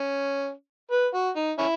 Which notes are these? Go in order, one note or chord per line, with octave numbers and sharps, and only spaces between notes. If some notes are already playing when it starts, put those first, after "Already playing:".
Already playing: C#4
B4
F#4
D#4
C#4 E4